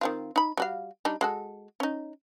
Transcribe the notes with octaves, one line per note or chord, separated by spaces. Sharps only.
D#3 C4 F4
D#4 B5
G3 F#4 F5
G3 D4 D#4
G#3 F#4 A4
C#4 D#4